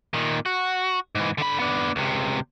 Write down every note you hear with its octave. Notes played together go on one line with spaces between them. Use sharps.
A#2 D#3
F#4
G#2 E3
D3 B5
B3 D4
C#2 C3